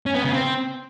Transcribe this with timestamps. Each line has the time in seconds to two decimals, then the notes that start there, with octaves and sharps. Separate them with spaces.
0.06 C#4
0.15 B3
0.24 C#3
0.34 C4